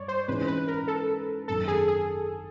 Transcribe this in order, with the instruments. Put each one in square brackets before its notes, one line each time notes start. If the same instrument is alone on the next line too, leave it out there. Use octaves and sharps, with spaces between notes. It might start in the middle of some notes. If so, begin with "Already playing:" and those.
Already playing: [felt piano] G2 [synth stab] C#5 D5
[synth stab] C5
[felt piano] G#2 E3 G#3 C#4 F4 [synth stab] B4
[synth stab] B4
A#4
A4
[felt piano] G#1 F#2 D#3 [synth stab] A4
[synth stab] G#4
G#4